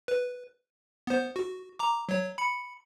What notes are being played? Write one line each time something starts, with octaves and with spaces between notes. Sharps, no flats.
B4
B3 C5
F#4
A#5 D6
F#3 C#5
B5 C#7